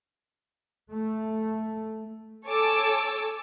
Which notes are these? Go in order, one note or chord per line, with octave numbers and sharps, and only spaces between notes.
A3
A4 C#5 G#5 A5 D6 E6